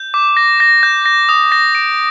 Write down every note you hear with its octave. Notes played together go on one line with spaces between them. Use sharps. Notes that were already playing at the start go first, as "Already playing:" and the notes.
Already playing: G6
D6
A#6
A#6
G6
A#6
D#6
A#6
D7